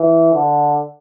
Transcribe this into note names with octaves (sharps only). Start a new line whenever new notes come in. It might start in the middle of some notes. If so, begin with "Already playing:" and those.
Already playing: E3
D3